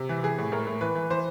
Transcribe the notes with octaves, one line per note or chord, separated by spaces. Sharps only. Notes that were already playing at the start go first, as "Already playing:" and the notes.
Already playing: C3
E3
E3 G#4
A2
A2 A#4
A2
E3 B4
E3
E3 C5